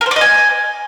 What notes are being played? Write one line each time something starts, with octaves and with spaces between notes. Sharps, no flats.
A#4
C5
D5
D#5
G#5